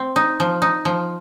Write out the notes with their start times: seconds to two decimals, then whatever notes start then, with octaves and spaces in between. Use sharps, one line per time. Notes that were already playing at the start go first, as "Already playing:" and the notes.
Already playing: C4
0.16 D#4
0.40 F3
0.62 D#4
0.85 F3